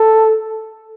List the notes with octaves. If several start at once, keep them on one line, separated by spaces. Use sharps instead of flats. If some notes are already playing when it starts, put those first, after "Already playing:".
Already playing: A4